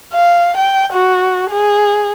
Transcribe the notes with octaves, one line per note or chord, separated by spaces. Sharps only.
F5
G5
F#4
G#4